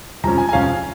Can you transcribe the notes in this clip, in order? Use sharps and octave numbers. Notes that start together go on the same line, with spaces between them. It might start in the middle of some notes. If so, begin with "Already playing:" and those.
F2 F3 G#3 C#4 A#5
G#5
G#5
F2 F3 G#3 C#4 F5